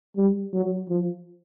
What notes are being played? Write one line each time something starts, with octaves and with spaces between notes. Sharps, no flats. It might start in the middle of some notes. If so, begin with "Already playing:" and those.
G3
F#3
F3